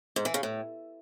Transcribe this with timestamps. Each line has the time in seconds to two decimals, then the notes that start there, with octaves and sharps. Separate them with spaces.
0.16 G#2
0.25 E3
0.34 C#3
0.43 A2